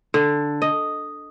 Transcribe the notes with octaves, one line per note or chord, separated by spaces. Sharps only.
D3
D#5